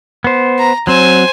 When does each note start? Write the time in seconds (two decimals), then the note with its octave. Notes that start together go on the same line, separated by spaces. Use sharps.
0.24 B3 C5
0.59 A#5
0.87 F#3 C4 C5 G#5